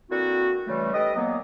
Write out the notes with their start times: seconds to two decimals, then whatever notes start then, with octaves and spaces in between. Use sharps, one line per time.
0.10 D3 A#3 C4 E4 F#4
0.67 C#3 E3 G3 A3
0.93 D#4 G4 A4 B4 D#5
1.15 A#2 F#3 A#3 B3